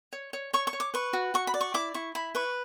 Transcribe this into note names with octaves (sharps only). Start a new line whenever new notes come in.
C#5
C#5
C#5 C#6
C#6
C#5
D6
B4 C#6
F#4
F#4 C#6
B5
D5
C#6
E4 D6
E4 C#6
E4 B5
B4 C#6